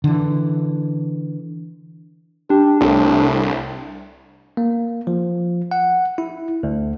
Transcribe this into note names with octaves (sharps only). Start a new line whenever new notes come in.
D3 E3
D4 G4
C2 A2
A#3
F3
F#5
E4
D2